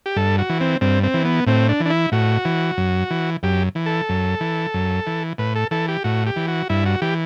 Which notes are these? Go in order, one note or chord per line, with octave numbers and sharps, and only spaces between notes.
G4
G2 A4
F#4
E3
C4
G2 C4
C4
E3
B3
A2 C4
D4
E3
D4
E4
A2 F#4
E3
F#2
E3
F#2 G4
E3
A4
F#2
E3
F#2
E3
A2 B4
A4
E3 A4
G4
A2 F#4
G4
E3
F#4
G2 E4
F#4
E3 G4